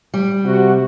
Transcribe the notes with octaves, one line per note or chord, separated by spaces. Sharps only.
G3
C3 F#4